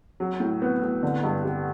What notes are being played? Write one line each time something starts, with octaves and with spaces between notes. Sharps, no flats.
F#3
A2
B3
A2
D3
G2
G3